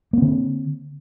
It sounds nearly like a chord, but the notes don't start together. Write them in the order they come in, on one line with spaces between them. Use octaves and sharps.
A#3 C4 D3